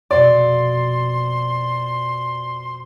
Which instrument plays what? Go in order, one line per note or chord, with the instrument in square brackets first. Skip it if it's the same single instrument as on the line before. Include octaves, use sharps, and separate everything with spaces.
[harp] F2 B2 [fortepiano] D5 [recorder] C6